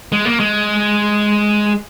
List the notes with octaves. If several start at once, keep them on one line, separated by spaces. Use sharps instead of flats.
G#3
A#3
G#3